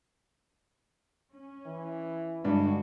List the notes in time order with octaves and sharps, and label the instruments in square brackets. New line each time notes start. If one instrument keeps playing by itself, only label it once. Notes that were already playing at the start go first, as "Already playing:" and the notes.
[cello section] C#4
[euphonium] E3
[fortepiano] G2 [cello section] D3 G#3 F#4